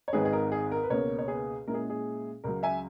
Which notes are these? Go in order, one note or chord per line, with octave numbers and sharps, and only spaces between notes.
C#5
G#1 G#2 D#3 G#3 D#4 G#4 B4
G#4
A#4
G#4
A#4
B4
C#2 B2 A#3 A#4 C#5
C#5
G#4 B4
A#2 G#3 C#4 E4 A#4
G#4
G#4
C#2 C#3 F#3 A#4
E5 G#5